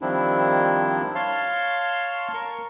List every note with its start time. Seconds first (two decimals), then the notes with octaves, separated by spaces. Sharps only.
0.01 D#3 F3 G3 C4 D4 E4
1.15 C#5 F5 A5 C6
2.34 A#4 C#6